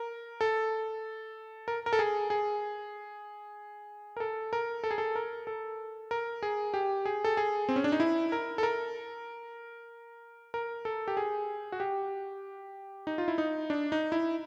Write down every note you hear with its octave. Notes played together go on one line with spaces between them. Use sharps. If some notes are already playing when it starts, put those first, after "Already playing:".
Already playing: A#4
A4
A#4
A#4
A4
G#4
G#4
A#4
A4
A#4
A4
G#4
A4
A#4
A4
A#4
G#4
G4
G#4
A4
G#4
C4
C#4
D4
D#4
E4
A#4
A4
A#4
A#4
A4
G4
G#4
F#4
G4
D#4
F4
E4
D#4
D4
D#4
E4